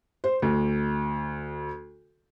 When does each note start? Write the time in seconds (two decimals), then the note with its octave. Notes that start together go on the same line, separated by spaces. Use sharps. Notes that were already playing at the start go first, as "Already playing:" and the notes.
0.24 C5
0.42 D2